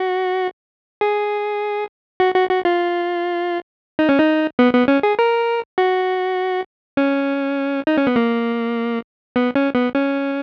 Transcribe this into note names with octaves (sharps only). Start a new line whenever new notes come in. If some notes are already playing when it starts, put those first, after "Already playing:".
Already playing: F#4
G#4
F#4
F#4
F#4
F4
D#4
C#4
D#4
B3
B3
C#4
G#4
A#4
F#4
C#4
D#4
C#4
B3
A#3
B3
C#4
B3
C#4